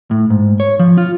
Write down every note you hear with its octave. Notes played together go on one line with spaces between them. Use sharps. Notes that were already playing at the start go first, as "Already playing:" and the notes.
A2
G#2
C#5
F3
F4